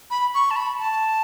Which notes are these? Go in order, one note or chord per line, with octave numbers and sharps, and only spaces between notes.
B5
C#6
A5
B5
A5